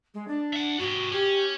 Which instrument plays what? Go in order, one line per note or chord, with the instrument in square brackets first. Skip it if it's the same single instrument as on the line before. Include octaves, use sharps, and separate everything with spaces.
[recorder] G#3
D4
[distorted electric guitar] E5 F#5
[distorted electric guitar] G#2 G4 [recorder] F#4
[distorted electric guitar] C#4 [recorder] G4